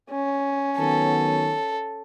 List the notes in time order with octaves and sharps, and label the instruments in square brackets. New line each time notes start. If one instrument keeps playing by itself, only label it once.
[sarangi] C#4
[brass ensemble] D#3 F#3 B3 [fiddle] A4